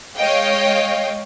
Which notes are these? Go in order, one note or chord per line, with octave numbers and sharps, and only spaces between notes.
G#3 C#5 D#5 F5 G5